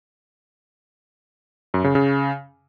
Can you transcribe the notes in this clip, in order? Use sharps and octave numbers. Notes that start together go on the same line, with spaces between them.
F#2
C#3
C#3